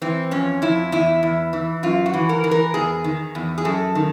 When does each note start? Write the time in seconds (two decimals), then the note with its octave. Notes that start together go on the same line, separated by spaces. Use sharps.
0.02 E3 C4
0.31 F2 C#4
0.62 F2 E4
0.92 E2 E4
1.23 E2
1.53 E3
1.83 F#2 F4
2.06 F#4
2.13 E3
2.29 A#4
2.44 E3
2.51 A#4
2.74 E2 G#4
3.04 D#3
3.35 E2
3.58 G#4
3.65 F#2 A4
3.95 D#3